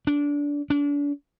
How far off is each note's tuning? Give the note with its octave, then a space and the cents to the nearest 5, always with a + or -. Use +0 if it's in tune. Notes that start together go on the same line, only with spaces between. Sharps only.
D4 -20
D4 -35